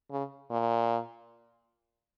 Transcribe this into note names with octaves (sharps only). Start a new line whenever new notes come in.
C#3
A#2